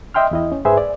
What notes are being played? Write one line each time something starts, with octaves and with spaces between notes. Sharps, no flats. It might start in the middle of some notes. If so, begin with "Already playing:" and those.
D#5 E5 G5 C6 F6
E2 E4 D#5
C#4
G#2 G#4 B4 C5 E5 G#5
D5